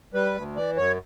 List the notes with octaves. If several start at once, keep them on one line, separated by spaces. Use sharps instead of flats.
G3 B4
D2
E3 D5
F#2 C#5